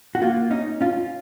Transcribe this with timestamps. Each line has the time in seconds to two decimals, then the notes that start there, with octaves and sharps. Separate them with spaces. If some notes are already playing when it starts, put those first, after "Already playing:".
0.15 F#4
0.22 A#3 F4
0.51 C#4 D#4
0.81 C#4 F4